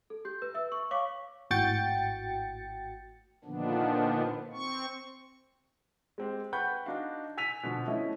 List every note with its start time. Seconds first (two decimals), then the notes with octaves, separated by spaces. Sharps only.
0.10 A4
0.25 G4 G6
0.42 B4
0.55 E5 E6
0.72 C#6
0.91 C#5 F5 C#6 D6 B6
1.51 G#1 A2 F#4 G5 A6 C#7
3.44 A#2 D3 D#3 F3 B3 D4
4.53 C4 C#6
6.18 G#3 C4 G4
6.53 B4 F#5 G5 B5 C#6 G6
6.86 D4 D#4 F#4 F5
7.37 G#5 E6 B6 D#7 F7
7.63 B2 D3 F3
7.87 F3 A3 C#4 E4 D#5 E5